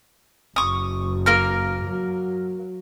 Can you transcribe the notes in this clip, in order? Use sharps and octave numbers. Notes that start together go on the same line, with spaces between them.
F#1 C#6 D#6
A#3 A#4 F6
F#3